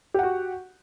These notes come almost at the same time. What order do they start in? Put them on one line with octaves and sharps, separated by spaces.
G4 F#5 F#4